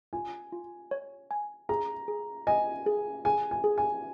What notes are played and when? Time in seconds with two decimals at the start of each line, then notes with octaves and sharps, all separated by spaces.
0.13 F4 G#5
0.52 F4
0.91 C#5
1.31 G#5
1.69 G#4 A#5
2.08 G#4
2.47 D#5 G#5
2.86 G#4
3.25 G#4 G#5
3.51 G#5
3.64 G#4
3.78 G#5